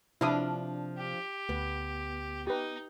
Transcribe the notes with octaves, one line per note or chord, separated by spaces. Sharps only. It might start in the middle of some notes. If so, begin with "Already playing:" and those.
C3 F3 D4 E4 D#6
G4
D2 B3
D#4 G4 B4